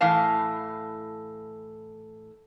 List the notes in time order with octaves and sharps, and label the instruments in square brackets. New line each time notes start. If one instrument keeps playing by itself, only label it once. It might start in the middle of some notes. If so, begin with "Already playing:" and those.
[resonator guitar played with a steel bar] A2 E3 F5 A5